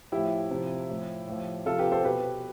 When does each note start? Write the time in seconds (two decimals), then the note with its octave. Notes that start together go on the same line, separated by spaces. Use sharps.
0.12 A2 F3 E4 G4
0.51 C3 F3
0.89 A2 F3
1.27 A2 F3
1.66 C3 F3 F4 A4
1.79 G4 B4
1.92 A4 C5
2.04 B2 G4 B4